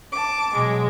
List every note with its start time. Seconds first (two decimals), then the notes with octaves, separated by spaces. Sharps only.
0.12 A5 D6
0.54 B2 F#3 G#3